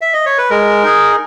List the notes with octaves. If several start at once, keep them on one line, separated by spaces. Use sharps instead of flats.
E5
D#5
C#5
B4
G#3 A#4
D#4 G#4